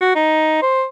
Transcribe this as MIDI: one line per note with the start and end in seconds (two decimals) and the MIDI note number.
0.01 0.15 66
0.16 0.61 63
0.62 0.84 72